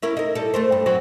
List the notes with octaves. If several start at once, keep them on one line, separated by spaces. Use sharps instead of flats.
C#4 E4 A#4
D#4 A#4
G3 A4
A3 A#4 C5
G2
F#3 C4 F#4